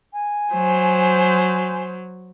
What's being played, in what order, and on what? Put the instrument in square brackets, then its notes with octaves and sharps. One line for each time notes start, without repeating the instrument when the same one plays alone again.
[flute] G#5
[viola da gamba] F#3 [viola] C5